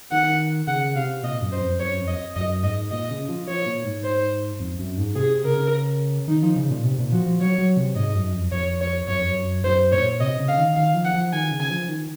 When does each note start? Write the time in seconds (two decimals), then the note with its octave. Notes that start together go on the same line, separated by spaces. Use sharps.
0.11 D#3 F#5
0.67 C#3 F#5
0.95 C3 F5
1.23 A#2 D#5
1.42 F#2
1.52 C5
1.61 F2
1.79 F#2 C#5
1.99 F2
2.07 D#5
2.36 F#2 D#5
2.63 G#2 D#5
2.91 A#2 D#5
3.11 C#3
3.29 F3
3.48 F3 C#5
3.66 A#2
3.85 G#2
4.04 C5
4.60 F2
4.79 F#2
4.98 G#2
5.15 C3 G#4
5.44 C#3 A#4
6.28 D#3 D#4
6.42 F3
6.56 C#3
6.70 A#2
6.84 C3
6.98 A#2
7.12 F3 F#4
7.26 F3
7.41 F#3 C#5
7.58 F#3
7.77 C3
7.96 G#2 D#5
8.15 F#2
8.34 F2
8.52 F2 C#5
8.81 C#5
9.08 F#2 C#5
9.19 F2
9.29 F#2
9.64 F#2 C5
9.92 A#2 C#5
10.20 C3 D#5
10.39 C#3
10.48 F5
10.58 D#3
10.76 D#3 F5
10.95 F3
11.04 F#5
11.14 F3
11.33 D#3 G#5
11.51 C#3
11.60 G#5
11.70 F3
11.89 D#3